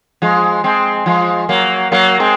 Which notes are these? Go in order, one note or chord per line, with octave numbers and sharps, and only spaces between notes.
F3 G#3
G#3 C4
F3 G#3
F#3 A#3
F#3 A#3
G#3 C4